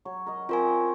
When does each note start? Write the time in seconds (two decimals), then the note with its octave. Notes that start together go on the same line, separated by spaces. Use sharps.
0.05 F#3 C#5
0.26 A#4 D#5
0.49 C4 F4 A#4 C#5 G#5